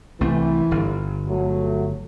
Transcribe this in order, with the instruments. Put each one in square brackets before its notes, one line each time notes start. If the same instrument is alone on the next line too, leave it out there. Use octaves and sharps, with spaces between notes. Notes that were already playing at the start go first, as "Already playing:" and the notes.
[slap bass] C2 A3 C4 [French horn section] E3
[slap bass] G1
[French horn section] F#3 A3